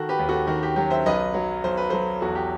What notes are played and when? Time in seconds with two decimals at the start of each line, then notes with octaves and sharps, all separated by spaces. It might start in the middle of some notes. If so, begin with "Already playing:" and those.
Already playing: D#3 F#4 A4
0.09 G4 B4
0.19 D#2
0.29 F#4 A4
0.47 D#3 F#4
0.63 G4
0.76 F#3 G4
0.90 C5 E5
1.06 B1 B4 D#5
1.34 F#3
1.64 B1 C5
1.77 B4
1.90 F#3 A4 C5
2.21 E2 F#4 A4
2.35 G4